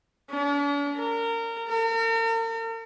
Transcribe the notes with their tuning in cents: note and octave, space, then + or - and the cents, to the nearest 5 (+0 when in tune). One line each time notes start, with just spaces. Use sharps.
D4 -45
A#4 -25
A#4 -45